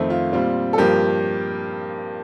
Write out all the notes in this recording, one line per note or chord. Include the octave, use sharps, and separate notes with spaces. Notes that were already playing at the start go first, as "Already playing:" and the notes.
Already playing: F2 D#3 A3 C4
F4
A#2 G3 C4 F4
A4
G2 F3 A#3 G4 A#4